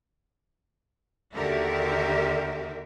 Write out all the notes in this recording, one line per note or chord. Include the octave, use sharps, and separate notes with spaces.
D#2 D3 F#4 G4 A#4 E5